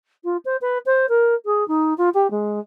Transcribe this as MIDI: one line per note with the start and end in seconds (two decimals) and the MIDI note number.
0.24 0.37 65
0.45 0.56 72
0.61 0.78 71
0.86 1.06 72
1.09 1.34 70
1.45 1.66 68
1.68 1.93 63
1.97 2.09 65
2.14 2.30 67
2.30 2.59 56